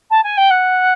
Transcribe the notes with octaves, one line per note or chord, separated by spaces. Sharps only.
A5
G#5
G5
F#5